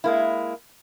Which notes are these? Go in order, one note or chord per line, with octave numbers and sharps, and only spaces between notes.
G#3 A#3 E4